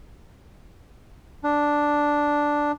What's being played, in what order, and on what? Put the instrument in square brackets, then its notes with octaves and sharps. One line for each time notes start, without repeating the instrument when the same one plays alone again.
[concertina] D4